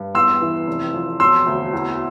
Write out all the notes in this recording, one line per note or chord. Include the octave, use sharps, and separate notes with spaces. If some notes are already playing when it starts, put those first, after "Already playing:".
Already playing: G2
E2 C6 E6
E3
F1
F2
E1 C6 E6
D2
E2